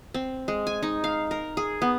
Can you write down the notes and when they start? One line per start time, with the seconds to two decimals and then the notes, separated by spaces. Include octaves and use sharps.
0.14 C4
0.48 G#3
0.67 G#5
0.83 D#4
1.04 F5
1.31 A#4
1.57 G#4
1.82 B3